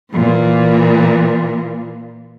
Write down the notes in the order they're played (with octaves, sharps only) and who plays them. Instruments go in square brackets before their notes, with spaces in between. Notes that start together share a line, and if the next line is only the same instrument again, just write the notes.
[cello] A#2 E3